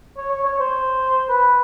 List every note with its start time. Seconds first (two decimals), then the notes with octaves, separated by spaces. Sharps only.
0.17 C#5
0.31 C#5
0.45 C#5
0.59 C5
1.29 B4